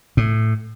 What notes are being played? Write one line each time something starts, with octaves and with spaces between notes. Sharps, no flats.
A2